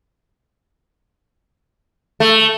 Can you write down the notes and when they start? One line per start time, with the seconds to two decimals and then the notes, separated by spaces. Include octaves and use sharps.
2.20 A3